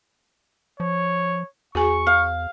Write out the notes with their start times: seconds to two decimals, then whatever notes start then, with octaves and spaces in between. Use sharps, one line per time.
0.80 F3 C#5
1.75 E2 F#4 G#4 G#5 C#6
2.07 F5